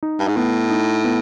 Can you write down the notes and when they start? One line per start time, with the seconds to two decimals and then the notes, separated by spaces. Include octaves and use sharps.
0.03 D#4
0.19 G2
0.28 G#2
0.37 A2 B3
0.70 D#4
1.04 B3